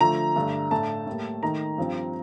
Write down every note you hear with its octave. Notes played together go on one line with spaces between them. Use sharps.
D3 F3 A3 A#5
G2 D3 A3 D4
A2 A3 D4 A5
A2 G3 A#3
D#3 A3 D#4 A#5
G2 F3 C4